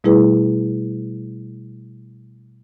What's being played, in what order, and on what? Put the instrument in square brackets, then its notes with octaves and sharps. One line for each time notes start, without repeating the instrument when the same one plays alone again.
[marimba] B2 G3 A3 E4 G#4 B4